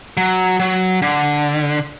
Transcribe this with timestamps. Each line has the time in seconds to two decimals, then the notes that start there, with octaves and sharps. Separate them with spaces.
0.17 F#3
0.60 F#3
1.02 D3